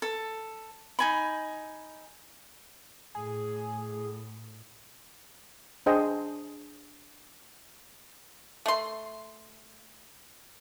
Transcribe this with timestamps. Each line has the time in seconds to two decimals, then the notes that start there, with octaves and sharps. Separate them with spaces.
0.02 A4
0.99 D#4 G#5 B5
3.15 A2 G#4
5.86 D4 G#4 C5 D#5 G5
8.66 A3 C6